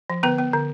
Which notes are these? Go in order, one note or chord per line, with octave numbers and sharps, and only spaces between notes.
F3
D3 B3 B4
B3
D3